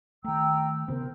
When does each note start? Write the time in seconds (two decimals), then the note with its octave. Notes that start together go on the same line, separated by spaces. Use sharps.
0.25 D#3 A3 G5 A#5 E6
0.88 A1 C3 B3 A#4 C5